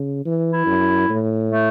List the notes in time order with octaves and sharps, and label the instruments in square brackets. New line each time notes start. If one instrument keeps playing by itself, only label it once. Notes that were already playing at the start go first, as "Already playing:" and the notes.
Already playing: [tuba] C#3
E3
[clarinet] E4
[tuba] F#2
A2
[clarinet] A3